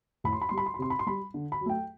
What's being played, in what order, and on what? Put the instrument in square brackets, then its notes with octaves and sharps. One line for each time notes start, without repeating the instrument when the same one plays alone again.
[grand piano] A2 B5
C6
B5
G3 C6
B5
C6
B5
C3 C6
B5
C6
G3 B5
D3
B5
F#3
A3 G5